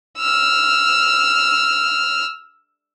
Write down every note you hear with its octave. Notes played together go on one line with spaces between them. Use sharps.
E6 F6